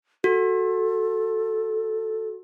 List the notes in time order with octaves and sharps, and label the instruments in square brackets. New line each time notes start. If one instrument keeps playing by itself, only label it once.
[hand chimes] F#4 [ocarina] A4